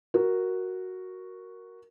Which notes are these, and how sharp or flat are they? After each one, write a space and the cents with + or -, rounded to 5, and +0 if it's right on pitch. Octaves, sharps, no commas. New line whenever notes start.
F#4 +0 A#4 +0